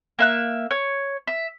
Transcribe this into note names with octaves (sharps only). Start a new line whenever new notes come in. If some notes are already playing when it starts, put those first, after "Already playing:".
A#3 E5 F#6
C#5
E5